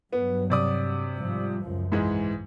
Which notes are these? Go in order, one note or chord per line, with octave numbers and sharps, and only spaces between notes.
G2 F#3 B3
C3 D5 D#6
G#2 F3 G3
C#2 F#2 F3
B1 G#2 E3 G#3